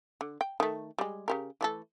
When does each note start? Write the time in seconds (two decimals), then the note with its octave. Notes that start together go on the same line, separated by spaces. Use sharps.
0.21 D3
0.41 G5
0.60 D#3 A3
0.98 G3 G#3
1.28 C#3 G4 A#4
1.61 E3 A3 A4